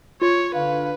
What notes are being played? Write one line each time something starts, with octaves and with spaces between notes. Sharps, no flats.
F4 C#5
D3 D4 B4 F5